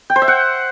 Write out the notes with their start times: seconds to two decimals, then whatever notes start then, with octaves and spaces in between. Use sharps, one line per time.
0.10 G5
0.16 C5
0.22 E5
0.28 F#5